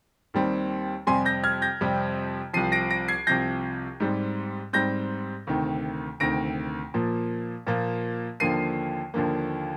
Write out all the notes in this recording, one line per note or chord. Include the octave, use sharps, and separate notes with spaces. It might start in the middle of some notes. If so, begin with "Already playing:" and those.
D#2 D#3 G3 C4
F2 C3 G3 C4 G#5 C6
G6 A#6
F6 G#6
G6 A#6
F2 C3 G3 C4
C2 C3 F3 C7 D#7
A#6 D7
A#6 D7
G#6 C7
C2 C3 F3 G6 A#6
G#2 G3 C4
G#2 G3 C4 G6 A#6
D2 C3 D#3
D2 C3 D#3 A#6 D7
A#2 F3 A#3
A#2 F3 A#3
D#2 D3 F3 A#3 C7 D#7
D#2 D3 F3 A#3